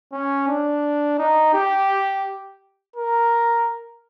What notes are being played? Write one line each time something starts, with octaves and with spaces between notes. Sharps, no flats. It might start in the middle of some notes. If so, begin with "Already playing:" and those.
C#4
D4
D#4
G4
A#4